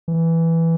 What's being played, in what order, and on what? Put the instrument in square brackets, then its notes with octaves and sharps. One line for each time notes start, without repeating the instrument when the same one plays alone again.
[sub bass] E3